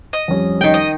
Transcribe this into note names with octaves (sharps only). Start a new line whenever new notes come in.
D#5
F2 G3 C#4
D#3 G5
D#5